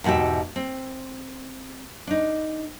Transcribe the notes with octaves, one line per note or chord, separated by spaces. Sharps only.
E2 G#2 B2 G4 E5
C4
D4 D#4